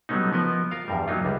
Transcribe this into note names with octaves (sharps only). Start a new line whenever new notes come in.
F#3 G3 A3 B3 C#4 D#4
F3 B3 A#4 D#5
F4 A#4 F5
E2 G2 G3
F#3 A#3 D#4 F4
C#2 G3